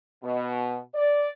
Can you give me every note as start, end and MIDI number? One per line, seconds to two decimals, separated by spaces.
0.24 0.78 47
0.95 1.33 74